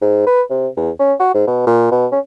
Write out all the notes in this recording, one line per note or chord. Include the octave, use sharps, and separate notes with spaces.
G#2
B4
C3
E2
C#4
F#4
G#2
B2
A#2
B2
C#4